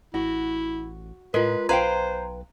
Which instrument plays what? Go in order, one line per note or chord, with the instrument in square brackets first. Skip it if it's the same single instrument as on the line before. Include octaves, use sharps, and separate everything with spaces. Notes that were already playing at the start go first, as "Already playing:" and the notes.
[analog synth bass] A1 [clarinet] E4 [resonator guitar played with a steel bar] F#4
[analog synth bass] A2 [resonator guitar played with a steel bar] G#3 [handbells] F4 A#4 [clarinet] B4
[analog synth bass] B1 [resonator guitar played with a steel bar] B4 F5 G5 [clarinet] C5 [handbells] A#5 C6 G#6